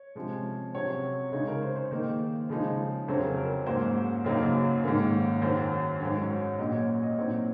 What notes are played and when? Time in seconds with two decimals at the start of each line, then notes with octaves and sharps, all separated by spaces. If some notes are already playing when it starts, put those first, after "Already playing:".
Already playing: C#5
0.15 C3 F3 G#3 C#4
0.74 C3 F#3 C#4 C#5
1.32 C#3 G#3 D#4 C#5
1.47 A#4
1.62 C5
1.76 C5
1.91 D#3 A#3 D#4 C5
2.49 C#3 F3 G#3 D#4
3.08 F2 C#3 F#3 C#4 C5
3.17 A#4
3.36 A#4
3.66 G#2 F#3 A#3 C#4 C5
4.24 F#2 C#3 F#3 A#3 D#4
4.84 G#2 D#3 A#3 C#4
5.41 F#2 D#3 F#3 C5
6.00 G#2 F#3 C#4
6.59 A#2 F#3 C#4 D#5
6.73 C#5
7.03 D#5
7.17 A#2 F#3 C4 D#4 C#5